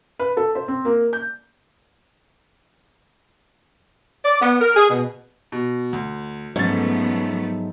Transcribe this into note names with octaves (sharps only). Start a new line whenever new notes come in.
B4
A4
C5
C4
A#3
G6
D5
B3
A#4
G#4
B2
B2
D2
G#2 F3 F#3 A3 B3 C#4 A6